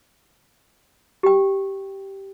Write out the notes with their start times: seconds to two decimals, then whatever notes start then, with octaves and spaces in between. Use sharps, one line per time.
1.23 G4 G5